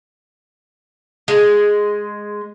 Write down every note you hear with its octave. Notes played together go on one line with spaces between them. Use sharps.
G#3